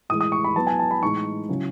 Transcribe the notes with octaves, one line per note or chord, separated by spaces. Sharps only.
A2 E3 G#3 D#6
D#6
C#6
B5
F#3 B3 E4 A5
G#5
A5
B5
A2 E3 G#3 D#4 C#6
C#3 F#3 C#4 E4